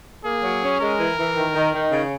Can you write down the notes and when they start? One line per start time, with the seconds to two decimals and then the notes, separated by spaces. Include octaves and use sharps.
0.24 A#3 G#4
0.43 F#3
0.62 C#4
0.80 G#3 A#4
0.99 E3
1.17 E3
1.36 D#3
1.55 D#3
1.73 D#3
1.91 C#3